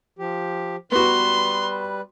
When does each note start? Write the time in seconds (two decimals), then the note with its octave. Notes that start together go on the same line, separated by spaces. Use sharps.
0.19 F3 G4
0.92 G3 B3 F#4 B4 C6